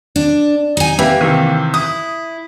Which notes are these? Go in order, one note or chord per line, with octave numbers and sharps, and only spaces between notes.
D4
D#4 G#5
A#3 G4 B4 E5
C3 D#3 E3
E4 D#6